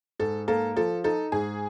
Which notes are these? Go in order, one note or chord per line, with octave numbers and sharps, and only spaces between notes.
G#2 A4
A#3 A4
F3 A4
D#4 A4
G#2 G#4